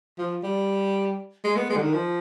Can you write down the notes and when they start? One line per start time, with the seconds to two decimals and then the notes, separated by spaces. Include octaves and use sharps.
0.18 F3
0.43 G3
1.44 G#3
1.56 B3
1.70 G#3
1.77 D3
1.82 D#3
1.94 F3